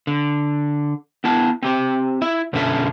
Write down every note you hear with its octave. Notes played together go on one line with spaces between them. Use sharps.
D3
B3 E4 A5
C4 G4 C5
E4 E5
F#2 B2 D3 C#4 A4 E5